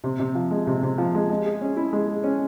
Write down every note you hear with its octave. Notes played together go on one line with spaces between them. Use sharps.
C3
C3
F3
G#3
C3
C3
F3
G#3
G#3
G#4
C#4
E4
G#3
G#4
C#4